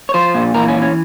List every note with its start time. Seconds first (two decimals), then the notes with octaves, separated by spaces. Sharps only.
0.09 C#5
0.14 F3 C5
0.35 A#2
0.54 E3 A#4
0.69 C#4
0.75 E3
0.82 C#4